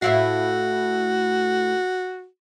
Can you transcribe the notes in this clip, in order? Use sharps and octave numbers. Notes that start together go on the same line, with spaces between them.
A2 E4 F#4 F5